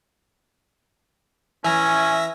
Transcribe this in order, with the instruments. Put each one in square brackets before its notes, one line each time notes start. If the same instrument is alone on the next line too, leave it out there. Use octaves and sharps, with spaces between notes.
[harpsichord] E3 [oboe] C#4 [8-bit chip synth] E5 A#6 [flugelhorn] G#5